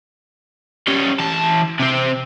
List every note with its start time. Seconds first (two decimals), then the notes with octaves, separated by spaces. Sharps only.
0.88 G3 C#4
1.20 E3 A5
1.80 C3 C4